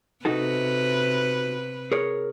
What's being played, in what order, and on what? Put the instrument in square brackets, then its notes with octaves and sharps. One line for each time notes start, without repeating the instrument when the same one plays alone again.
[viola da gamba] C3 B4 [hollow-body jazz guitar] D#4 F#4 A4
[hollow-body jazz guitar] G#4 A#4 C#5